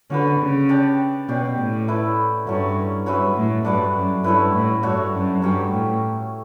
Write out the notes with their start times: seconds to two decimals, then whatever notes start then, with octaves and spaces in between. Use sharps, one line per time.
0.10 D3 C#4 F#4 B4
0.40 C#3
0.69 D4 G4 D5
1.28 B2 C#4 G4 D5
1.58 A2
1.88 A3 E4 B4
2.46 G2 F#3 A3 C#4
3.05 G2 C#4 F#4 B4 E5
3.35 A2
3.64 G2 D4 F#4 B4 D5
3.94 F#2
4.24 G2 A3 C#4 E4 B4
4.54 A2
4.83 G2 A3 D4 F#4 C#5
5.13 F#2
5.42 G2 F#3 C#4 G4
5.71 A2